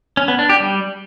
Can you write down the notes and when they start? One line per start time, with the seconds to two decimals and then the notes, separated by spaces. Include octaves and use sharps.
0.17 C#4
0.28 B3
0.39 D4
0.49 G4
0.60 G3